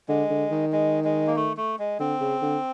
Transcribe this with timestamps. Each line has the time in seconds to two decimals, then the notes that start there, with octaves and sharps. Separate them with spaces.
0.08 D3 G#3
0.30 D3
0.51 D#3
0.72 G#3
1.04 G#3
1.27 A#3
1.36 A3
1.57 A3
1.79 G#3
2.00 D3 C4
2.21 C#3
2.42 D3